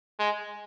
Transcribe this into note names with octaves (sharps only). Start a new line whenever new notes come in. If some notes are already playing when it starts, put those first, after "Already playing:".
G#3